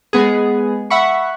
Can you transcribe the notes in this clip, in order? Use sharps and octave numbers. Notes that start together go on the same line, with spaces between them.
G#3 B3 G#4
E5 F#5 B5 C#6